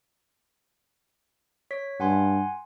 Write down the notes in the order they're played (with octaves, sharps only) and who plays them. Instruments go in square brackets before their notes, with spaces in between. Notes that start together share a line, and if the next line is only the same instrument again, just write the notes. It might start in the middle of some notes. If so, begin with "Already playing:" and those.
[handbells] C#5 B6
[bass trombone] G2 [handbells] F#5 G#5 C6